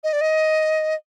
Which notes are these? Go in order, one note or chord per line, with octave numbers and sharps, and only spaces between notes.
D#5
D5
D#5